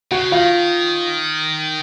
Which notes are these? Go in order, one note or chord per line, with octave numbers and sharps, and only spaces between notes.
C#3 F#4 F#5
D#3 F4 F5